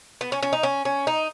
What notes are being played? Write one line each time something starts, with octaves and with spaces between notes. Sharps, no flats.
B3
C#4
C#4
D#4
C#4
C#4
D#4